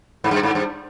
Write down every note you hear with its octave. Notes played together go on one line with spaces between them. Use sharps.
G#2
G2
G#2
G2